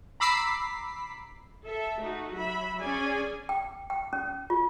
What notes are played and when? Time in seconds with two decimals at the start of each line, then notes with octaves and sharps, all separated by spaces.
0.20 A#5 B5 D6 E6 B6 C7
1.65 A4 E5
1.99 A3 D#4 F#4
2.35 F#3 E5 B5
2.82 C#4 G#4 D5 G#5
3.49 G5
3.90 G5
4.13 C#4
4.50 F4